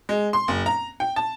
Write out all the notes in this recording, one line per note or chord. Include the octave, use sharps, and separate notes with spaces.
G#3
C6
F#1
A#5
G5
A5